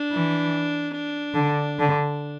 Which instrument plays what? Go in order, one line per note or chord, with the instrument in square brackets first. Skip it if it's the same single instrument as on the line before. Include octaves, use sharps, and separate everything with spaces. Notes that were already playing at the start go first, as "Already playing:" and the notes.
Already playing: [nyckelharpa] D4
[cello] E3
D3
D3